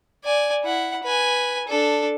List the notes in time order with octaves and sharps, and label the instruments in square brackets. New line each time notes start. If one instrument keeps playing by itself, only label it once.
[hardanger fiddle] D5 G#5
E4 F#5
B4 G#5
D4 A4